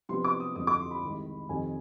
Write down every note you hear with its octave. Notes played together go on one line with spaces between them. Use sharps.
C3 F3 B3 D4 C6
D6
D#6
F2 D3 F3 D#6
D6
C6
B5
C2 C3 D#3 G#3
F2 C3 D#3 G#5